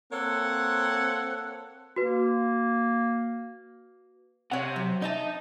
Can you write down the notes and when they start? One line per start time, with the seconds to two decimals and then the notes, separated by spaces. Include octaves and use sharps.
0.12 A#3 C4 A4 C#5 F#5
1.96 A#3 F#4 B4
4.51 C3 C#5 F#5
4.76 F#3
5.02 D#4 D#5 E5 A5